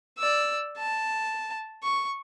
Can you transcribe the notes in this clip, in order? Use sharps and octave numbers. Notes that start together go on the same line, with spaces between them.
D5 E6
A5
C#6